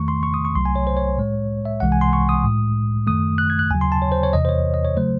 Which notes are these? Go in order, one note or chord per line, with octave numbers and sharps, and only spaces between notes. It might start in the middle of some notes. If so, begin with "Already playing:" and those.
Already playing: E2 D#3 A3 C#6
C6
C#6
D#6
C#6
C2 C3 F#3 A3 C6
G#5
C#5
C5
C#5
A2 G#3
E5
C2 C3 E3 G#3 F#5
G#5
C6
C#6
D#6
A2 G#3
F#2 D#3 A3 D#6
F#6
G#6
F#6
D#2 C#3 F#3 G#5
C6
A5
C#5
C5
C#5
E2 C3 E3 D#5
C5
C#5
D#5
C#5
C#3 F#3 A3 C5